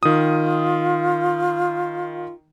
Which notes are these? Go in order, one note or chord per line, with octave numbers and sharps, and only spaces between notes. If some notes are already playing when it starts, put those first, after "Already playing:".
D#3 F4 D#6